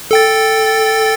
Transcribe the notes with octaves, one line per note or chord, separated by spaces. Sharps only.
A4 G5 A6